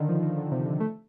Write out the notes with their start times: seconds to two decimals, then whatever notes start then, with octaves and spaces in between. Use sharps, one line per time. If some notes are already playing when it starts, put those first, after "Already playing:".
Already playing: D3 D#3
0.09 F3
0.22 D#3
0.37 D3
0.52 C3
0.65 D3
0.80 A3